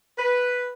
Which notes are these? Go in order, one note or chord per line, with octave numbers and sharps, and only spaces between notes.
B4